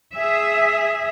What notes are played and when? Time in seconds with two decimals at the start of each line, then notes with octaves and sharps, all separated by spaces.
0.15 G#4 E5